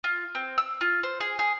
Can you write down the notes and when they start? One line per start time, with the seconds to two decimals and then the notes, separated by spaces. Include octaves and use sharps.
0.04 F4
0.35 C4
0.58 E6
0.81 F4
1.03 C5
1.20 G#4
1.39 G#4